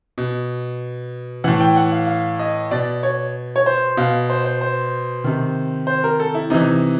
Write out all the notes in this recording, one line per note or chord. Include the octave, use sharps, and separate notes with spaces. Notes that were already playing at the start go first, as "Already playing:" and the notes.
B2
A2 E3 F#5
G5
F#5
F5
F5
D#5
B2 D5
C#5
C#5
C5
B2 F5
C5
C5
C5
C3 D#3
C5
A#4
A4
E4
C3 E3 D#4